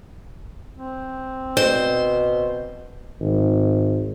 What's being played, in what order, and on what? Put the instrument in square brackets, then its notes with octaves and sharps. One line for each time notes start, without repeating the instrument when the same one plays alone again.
[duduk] C4
[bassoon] B2 [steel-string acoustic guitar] C5
[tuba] G#1